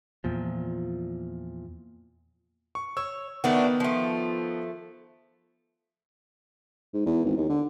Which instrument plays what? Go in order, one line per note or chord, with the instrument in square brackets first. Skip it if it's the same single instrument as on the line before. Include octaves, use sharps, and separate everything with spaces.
[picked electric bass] E2 A#2 F3
[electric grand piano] C#6
[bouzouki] C#5 [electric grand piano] E6
[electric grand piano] D#3 B3 [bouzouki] A3 D4 F#4
[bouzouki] F3 A3
[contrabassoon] G#2
E2
G#1
D#2
D3